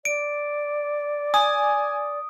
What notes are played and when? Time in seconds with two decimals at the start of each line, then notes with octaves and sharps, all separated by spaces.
0.05 D5 D7
1.34 G#5 D#6